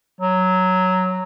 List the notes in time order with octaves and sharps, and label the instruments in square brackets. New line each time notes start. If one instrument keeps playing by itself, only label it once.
[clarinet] F#3